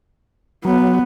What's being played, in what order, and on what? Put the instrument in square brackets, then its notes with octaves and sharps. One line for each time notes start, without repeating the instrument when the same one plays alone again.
[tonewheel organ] F#3 [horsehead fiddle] B3